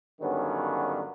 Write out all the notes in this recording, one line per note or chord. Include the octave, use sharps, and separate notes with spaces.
G2 D3 D#3 F#3 B3 C#4